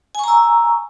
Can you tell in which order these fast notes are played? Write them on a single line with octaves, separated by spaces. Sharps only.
G#5 C#6 A#5 E6